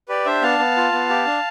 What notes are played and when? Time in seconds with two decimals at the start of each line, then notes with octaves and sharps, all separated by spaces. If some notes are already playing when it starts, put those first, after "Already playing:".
0.09 G4 B4 D5
0.25 D4 C5 E5
0.42 B3 F5 A5
0.59 B3
0.77 F4
0.92 B3
1.10 G4
1.26 D4